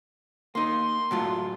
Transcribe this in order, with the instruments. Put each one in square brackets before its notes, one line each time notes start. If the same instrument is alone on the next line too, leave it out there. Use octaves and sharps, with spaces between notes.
[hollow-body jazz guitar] A#3 D#4 [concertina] C6
[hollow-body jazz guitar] A2 F#3 F4